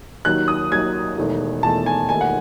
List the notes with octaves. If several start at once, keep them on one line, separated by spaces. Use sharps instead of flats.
D#2 D#3 F#3 F#6
D#6
D#2 D#3 F#3 G#6
E1 E2 D#3 A3
E1 E2 D#3 A3 A5
G#5
E1 D#2 D#3 A3 G#5
F#5